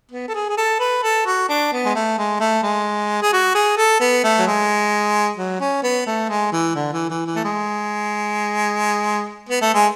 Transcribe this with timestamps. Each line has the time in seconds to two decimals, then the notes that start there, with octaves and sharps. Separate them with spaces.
0.12 B3
0.28 A4
0.35 G#4
0.50 G#4
0.58 A4
0.80 B4
1.03 A4
1.26 F#4
1.49 D4
1.72 B3
1.85 G#3
1.95 A3
2.18 G#3
2.40 A3
2.63 G#3
3.22 G#4
3.33 F#4
3.55 G#4
3.77 A4
4.00 B3
4.24 A3
4.39 F#3
4.47 G#3
5.37 F#3
5.60 C#4
5.83 B3
6.07 A3
6.29 G#3
6.53 E3
6.75 D3
6.93 E3
7.10 E3
7.26 E3
7.36 A3
7.44 G#3
9.50 B3
9.62 A3
9.74 G#3